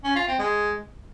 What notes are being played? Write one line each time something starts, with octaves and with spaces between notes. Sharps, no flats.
C#4
F4
C4
G#3